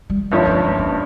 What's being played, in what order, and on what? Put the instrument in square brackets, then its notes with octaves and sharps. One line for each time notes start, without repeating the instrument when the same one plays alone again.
[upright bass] G3
[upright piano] G1 G2 F3 C#4 [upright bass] G3
[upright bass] A#3
A3
A#3
A#3